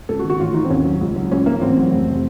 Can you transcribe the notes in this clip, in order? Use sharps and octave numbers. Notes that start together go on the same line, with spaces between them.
C#2 A4
F#4
D#3
F#4
A1 F4
F3 D#4
C4
D#2 C#4
F#3
C#2
F#3
C#2 C#4
F3 A#3
A1 C4
F#3
F1
C3